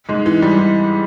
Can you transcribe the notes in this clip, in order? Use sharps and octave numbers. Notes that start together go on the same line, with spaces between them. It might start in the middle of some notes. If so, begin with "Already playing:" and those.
G#2 G#3
E3
G3
E3